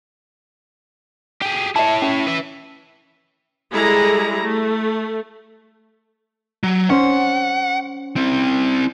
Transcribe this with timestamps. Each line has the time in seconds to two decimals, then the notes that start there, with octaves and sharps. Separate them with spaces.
1.42 G4 G#4
1.76 E4 C#5 E5 A5
2.02 C#4
2.27 B4 E5
3.71 G3 G#3 E4 G#4 A4 A#5
4.42 A3
6.63 F#3
6.90 C#4 C5 F#5
8.16 C4 E4